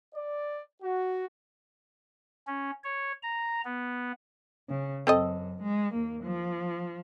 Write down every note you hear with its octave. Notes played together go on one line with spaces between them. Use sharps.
D5
F#4
C#4
C#5
A#5
B3
C#3
F#2 C4 A4 D#5
G#3
D#2 A#3
F3